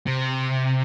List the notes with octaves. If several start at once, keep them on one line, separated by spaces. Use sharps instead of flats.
C3